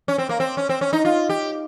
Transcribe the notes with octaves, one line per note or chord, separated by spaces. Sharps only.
C#4
C4
A#3
C4
C#4
C4
C#4
D#4
F4
G4